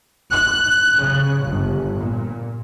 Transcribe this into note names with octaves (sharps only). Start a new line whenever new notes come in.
F#6
C#3
G1
A#2